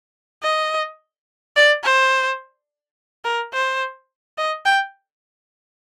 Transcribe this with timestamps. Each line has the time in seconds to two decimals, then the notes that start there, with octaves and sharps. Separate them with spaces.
0.43 D#5
1.56 D5
1.84 C5
3.25 A#4
3.54 C5
4.38 D#5
4.65 G5